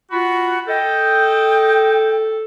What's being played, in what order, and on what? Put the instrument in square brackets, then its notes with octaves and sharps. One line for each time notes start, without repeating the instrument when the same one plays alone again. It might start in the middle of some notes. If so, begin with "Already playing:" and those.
[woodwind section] F4 F#4 [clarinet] B5
[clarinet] A4 [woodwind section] D#5 G5